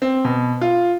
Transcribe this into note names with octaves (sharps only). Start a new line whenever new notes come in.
C4
B2
F4